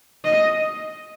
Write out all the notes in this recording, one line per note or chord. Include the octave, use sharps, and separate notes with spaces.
D#5